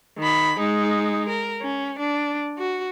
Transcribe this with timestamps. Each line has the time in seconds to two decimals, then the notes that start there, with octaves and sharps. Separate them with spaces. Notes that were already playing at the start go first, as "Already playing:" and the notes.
0.18 D#3 B5
0.59 G#3 D#4
1.29 A#4
1.62 C#4
1.99 D4
2.58 F#4